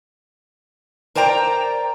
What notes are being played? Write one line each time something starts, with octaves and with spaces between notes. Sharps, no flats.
A#4 C5 D5 G5 A#5